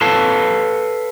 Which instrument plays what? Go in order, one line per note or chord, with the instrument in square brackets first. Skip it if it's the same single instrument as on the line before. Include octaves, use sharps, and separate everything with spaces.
[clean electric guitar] A4 B4 C#5 F5 A5